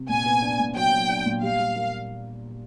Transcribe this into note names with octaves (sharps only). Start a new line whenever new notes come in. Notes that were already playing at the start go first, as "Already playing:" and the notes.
Already playing: C3
A#2 G#5
B3
D4
A#2
F#3 G5
F#3
D4
A#2
G3 F5
G3
A#3